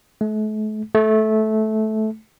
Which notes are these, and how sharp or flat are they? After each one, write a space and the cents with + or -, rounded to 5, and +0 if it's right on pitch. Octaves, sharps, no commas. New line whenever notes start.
A3 -40
A3 -15